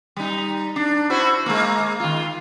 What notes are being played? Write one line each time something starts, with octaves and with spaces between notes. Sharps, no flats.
G3 D#4
D4
E4 F#4 C5
G#3 A#3
D#3 F4